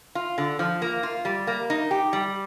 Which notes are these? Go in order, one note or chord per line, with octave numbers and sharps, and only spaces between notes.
F4
D3
F3
A#3
F4
G3
A#3
D#4
G4
G3